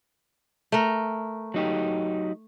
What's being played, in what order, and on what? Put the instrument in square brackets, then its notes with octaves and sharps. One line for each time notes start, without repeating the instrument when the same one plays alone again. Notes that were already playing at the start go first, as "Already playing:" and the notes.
[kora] A3 A#4
[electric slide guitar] F#3 D#4 G4